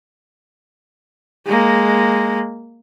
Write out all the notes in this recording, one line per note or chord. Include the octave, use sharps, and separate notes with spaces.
G#3 A#3